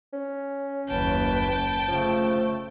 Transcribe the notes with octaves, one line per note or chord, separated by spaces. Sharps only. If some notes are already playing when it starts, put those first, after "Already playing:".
C#4
F#1 D#2 B4 G5 A5
C#3 F3 A3